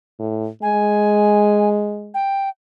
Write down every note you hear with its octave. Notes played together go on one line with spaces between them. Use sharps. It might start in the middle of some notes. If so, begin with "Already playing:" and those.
A2
G#3 G#5
G5